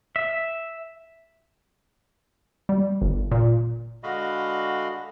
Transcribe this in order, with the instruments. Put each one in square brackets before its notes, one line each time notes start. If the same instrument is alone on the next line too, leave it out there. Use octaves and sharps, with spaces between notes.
[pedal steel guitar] E5
[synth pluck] G3
G1
A#2
[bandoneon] D3 G#3 F#4 D#5 F5 B5